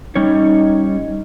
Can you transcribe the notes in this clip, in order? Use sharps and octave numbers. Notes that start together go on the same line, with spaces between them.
G3 C#4 D#4 C#5